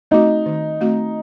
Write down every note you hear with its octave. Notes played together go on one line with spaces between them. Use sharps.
A3 C4 D#4 F#4
D#3
A3 C4 F#4